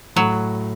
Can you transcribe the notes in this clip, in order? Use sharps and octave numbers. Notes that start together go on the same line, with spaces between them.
A2 F#3